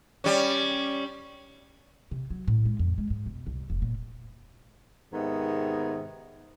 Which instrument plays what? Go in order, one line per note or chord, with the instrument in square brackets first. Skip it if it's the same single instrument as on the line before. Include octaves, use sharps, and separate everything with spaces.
[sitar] G3 C#4
[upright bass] C3
F#3
A2
G#3
F2
G#3
G#2
B2
C2
F1
A#2
[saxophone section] G#2 C3 D#3 B3